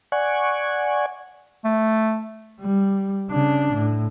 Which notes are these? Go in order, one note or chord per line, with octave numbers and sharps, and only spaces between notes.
D5 F#5 G#5 C#6
A3
G3
C#3 D4
A2